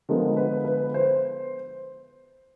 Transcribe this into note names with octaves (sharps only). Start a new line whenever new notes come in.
D3 F3 G#3 B3 A#4
B4
B4
C5